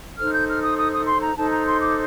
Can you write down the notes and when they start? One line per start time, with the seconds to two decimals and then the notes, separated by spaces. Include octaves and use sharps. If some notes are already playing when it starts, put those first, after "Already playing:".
0.18 D#4 A4 C5 F6
0.33 G6
0.48 F6
0.63 D#6
0.77 D#6
0.92 D#6
1.07 C6
1.22 A#5
1.37 D#4 A4 C5 A5
1.52 A#5
1.66 C6
1.81 D6